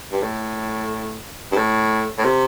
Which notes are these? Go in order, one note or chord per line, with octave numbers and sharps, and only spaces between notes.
G2
A2
G2
A2
A2
C3